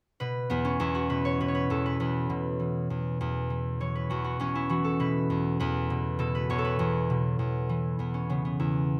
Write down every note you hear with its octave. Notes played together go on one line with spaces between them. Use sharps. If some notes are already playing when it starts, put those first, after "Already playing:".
B2 B4
E2 B3
C#4
E2 E4
F#4
B2 B4
C#5
B2 B4
C#5
B4
E2 A4
B4
E2 B4
B2
E3
E2
E2
E3
E3 C#5
B4
E2 F#4
F#4
E2 C#4
E4
E3 F#4
A4
B2 B4
E2
E2 B4
B2
B2 A4
B4
E2 C#5
A4
B4
E2
B2
E2
E3
E2 B3
C#4
C#3 B3
B3
E2 E4